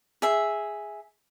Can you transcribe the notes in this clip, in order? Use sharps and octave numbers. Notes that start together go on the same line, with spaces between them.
G#4 E5